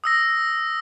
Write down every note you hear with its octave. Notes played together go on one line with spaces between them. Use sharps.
D#6 E6 A#6